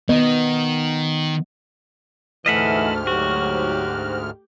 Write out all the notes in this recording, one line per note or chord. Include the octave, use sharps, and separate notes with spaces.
D#3 B3 D#5
D2 G#2 E3 A3 D#5 E5 F#5 F6
F#3 F#4 G4